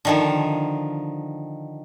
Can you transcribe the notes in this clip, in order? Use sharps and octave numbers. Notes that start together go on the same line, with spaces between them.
D3 D#3 F3